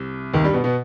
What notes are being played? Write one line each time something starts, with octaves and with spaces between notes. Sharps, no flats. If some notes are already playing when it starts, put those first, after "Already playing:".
Already playing: C2 C3
D#2 D#3
G2 G3
B2 B3
B2 B3